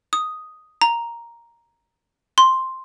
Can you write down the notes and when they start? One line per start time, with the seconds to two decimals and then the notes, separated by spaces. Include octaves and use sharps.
0.13 D#6
0.82 A#5
2.38 C6